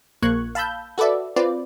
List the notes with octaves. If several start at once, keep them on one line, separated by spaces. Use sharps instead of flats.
A#1 A#3 C#6 F#6 G#6
F5 A5 B5 E6 G6
F#4 A4 B4 D5 E5
C4 F4 B4 D5